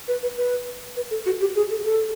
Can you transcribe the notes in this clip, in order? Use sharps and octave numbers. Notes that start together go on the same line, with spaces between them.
B4
B4
B4
B4
A4
F#4
G4
G#4
A4
A4